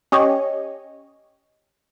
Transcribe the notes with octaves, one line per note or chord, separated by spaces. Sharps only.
C#4 G4 C#5 D#5